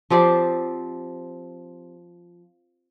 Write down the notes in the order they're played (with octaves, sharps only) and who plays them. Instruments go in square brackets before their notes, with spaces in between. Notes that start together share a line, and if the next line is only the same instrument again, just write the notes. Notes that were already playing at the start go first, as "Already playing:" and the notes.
[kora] F3 C4 G4 D5